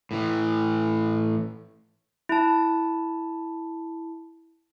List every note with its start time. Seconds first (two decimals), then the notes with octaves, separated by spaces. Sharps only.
0.11 A2 E3
2.29 E4 A5